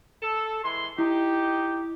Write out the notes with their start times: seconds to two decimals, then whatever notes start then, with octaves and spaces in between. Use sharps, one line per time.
0.22 A4
0.64 E3 G#3 C6
0.99 D#4 E4 G4